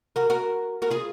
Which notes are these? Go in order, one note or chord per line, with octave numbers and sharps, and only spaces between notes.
F#4 A#4
F#4 A#4
F#4 A#4
F4 G#4